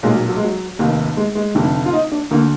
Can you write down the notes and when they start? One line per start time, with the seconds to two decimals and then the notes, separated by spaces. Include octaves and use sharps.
0.03 B1 A#2 G#3
0.16 F#3
0.29 F#3
0.37 G#3
0.44 F#3
0.79 F1 D#2 D#3
1.17 G#3
1.35 G#3
1.55 F1 F2 D3
1.86 F4
1.93 D#4
2.12 D4
2.31 D2 A#3
2.34 D3